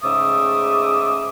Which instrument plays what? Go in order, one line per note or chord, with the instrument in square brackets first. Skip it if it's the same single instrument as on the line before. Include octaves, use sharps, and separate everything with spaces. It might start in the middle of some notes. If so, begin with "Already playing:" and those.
[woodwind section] G#2 C#3 A3 E5 D6 D#6